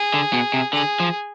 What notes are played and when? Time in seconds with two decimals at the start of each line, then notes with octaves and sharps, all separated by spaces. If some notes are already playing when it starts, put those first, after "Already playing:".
Already playing: G#4
0.14 D3
0.33 B2
0.54 C3
0.73 D3 G#4
1.00 F3